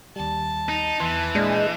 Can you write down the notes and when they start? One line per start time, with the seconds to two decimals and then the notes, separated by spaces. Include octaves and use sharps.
0.16 D#2 G3 A5
0.69 D#4
1.00 E2 E3 C6
1.35 A#2 G#3 D4 G6